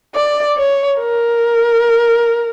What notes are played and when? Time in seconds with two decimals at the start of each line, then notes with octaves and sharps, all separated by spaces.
0.15 D5
0.57 C#5
0.99 A#4